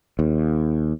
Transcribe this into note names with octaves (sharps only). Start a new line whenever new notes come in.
D#2